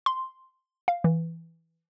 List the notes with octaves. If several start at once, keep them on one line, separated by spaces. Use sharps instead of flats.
C6
F5
E3